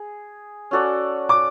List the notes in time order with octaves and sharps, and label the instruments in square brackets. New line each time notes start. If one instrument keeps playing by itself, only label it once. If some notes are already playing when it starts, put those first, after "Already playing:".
Already playing: [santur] G#4
C#4 F#4 A4 D5
[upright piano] D6